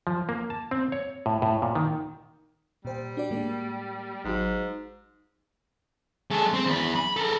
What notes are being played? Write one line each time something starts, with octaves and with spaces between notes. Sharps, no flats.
F3
A#3
A5
C4
C#5
A2
A2
A#2
D#3
A#2 G3 C5 G5
D4 F#4 D5
A2 G#3 A#3
G#1 G#2 F#3 F#4
G#3 A4
C4
E2 B5
B5
A4 A#4